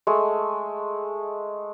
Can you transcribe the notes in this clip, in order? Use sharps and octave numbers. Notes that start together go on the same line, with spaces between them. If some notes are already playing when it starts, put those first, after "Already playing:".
G#3 A3